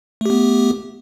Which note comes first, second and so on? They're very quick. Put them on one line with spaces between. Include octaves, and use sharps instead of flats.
A3 G4 B3